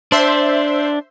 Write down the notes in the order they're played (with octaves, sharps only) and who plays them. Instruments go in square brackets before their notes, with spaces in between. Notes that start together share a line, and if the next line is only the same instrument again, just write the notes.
[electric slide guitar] D4 [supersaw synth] C5 E5 C6